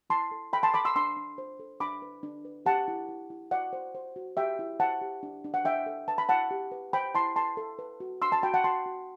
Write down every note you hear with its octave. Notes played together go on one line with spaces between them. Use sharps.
E4 A5 C6
A4
A4 G5 B5
A5 C6
A4 B5 D6
C6 E6
D4 C6 E6
D4
C5
A4
D4 B5 D6
B4
D4
B4
G4 F#5 A5
E4
E4
E4
F#4 D5 F#5
C5
C5
F#4
G4 E5 G5
E4
C5 F#5 A5
G4
D4
D4
F#5
D4 E5 G5
A4
B4 A5
B5
E4 F#5 A5
G4
B4
C5 G5 B5
E4 A5 C6
A4 A5 C6
A4
B4
F#4
D4 C6 E6
A5 C6
F#4 G5 B5
F#5 A5
F#4 A5 C6
F#4